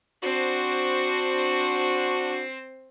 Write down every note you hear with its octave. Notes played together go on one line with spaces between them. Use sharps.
C4 D4 F#4 C5